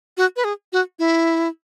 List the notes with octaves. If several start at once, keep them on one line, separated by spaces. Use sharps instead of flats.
F#4
B4
G#4
F#4
E4